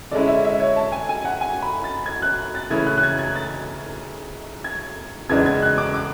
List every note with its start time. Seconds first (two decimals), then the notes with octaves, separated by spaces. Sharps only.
0.11 D3 G#3 C#4 E4 D5
0.28 E5
0.45 E5
0.60 C#5
0.76 A5
0.92 G#5
1.09 G#5
1.25 F#5
1.41 G#5
1.62 B5
1.84 A6
2.06 G#6
2.22 F#6
2.55 A6
2.70 C#3 E3 A3 C#4 E4 G#6
2.87 F#6
2.98 F#6
3.03 G#6
3.19 G#6
3.35 A6
4.64 G#6
5.29 E2 C#3 E3 G#3 D4 G#6
5.46 G#6
5.62 F#6
5.78 D6
5.94 D6